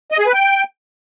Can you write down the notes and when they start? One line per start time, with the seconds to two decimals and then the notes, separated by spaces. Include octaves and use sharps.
0.12 D#5
0.19 G#4
0.26 B4
0.34 G5